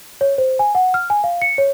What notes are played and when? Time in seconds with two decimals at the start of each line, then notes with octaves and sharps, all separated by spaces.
0.21 C#5
0.38 C5
0.59 G#5
0.75 F#5
0.94 F6
1.10 G#5
1.24 F5
1.42 C#7
1.58 C#5